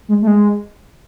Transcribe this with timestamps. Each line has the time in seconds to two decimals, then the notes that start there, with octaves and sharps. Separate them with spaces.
0.08 G#3
0.22 A3
0.27 G#3